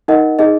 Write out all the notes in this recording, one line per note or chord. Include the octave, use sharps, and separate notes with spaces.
D#4 A#4 D#5 F#5
D#4 G#4 D#5